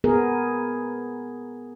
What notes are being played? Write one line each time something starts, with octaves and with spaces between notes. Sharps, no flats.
B3 G#4 A#4